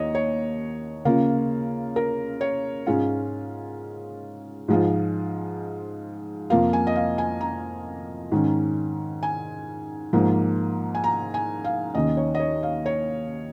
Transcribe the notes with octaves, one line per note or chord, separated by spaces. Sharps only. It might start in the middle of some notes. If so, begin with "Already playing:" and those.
Already playing: D#2 D#3 A#3 C#5 D#5
C#5
C#3 A#3 F4
A#4
C#5
G#2 G#3 C#4 F4
G#2 F3 G#3 F4
F2 F3 A#3 F4 F5
G#5
D#5
F5
G#5
A#5
G#2 D#3 C#4
G#5
G#2 F3 A#3
G#5
A#5
G#5
F5
D#2 D#3 C#4 D#5
C#5
D#5
C#5
F5
C#5